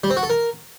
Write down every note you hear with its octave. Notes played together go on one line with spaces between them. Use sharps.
G3
C4
F#4
A4
A#4